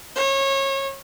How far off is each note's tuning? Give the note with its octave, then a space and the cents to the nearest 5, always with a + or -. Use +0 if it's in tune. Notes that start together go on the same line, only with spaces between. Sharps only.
C#5 -25